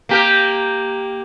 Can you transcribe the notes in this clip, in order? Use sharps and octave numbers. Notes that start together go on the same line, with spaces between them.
A#3 G4 A#4